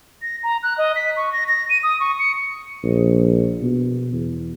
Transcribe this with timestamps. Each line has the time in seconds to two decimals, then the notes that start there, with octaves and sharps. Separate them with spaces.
0.22 A#6
0.43 A#5
0.63 F#6
0.78 D#5
0.96 B6
1.17 C#6
1.33 A#6
1.49 A#6
1.69 D#7
1.83 D#6
2.00 C#6
2.19 C#7
2.84 A#1
3.61 B2
4.13 E2